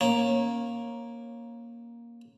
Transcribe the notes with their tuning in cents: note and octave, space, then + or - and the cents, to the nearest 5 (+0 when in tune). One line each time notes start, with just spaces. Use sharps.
A#3 +10 C#4 -20